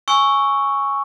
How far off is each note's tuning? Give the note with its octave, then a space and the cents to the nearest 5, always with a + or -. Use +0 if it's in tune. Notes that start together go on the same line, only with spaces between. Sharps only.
G#5 +0 C#6 +0 E6 +0